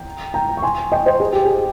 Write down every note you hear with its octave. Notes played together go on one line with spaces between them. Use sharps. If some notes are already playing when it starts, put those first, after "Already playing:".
Already playing: G5 A#5
G5 A#5
C#6
G#5 C6
D#5 G5
C5 D#5
G#4
G4
G#4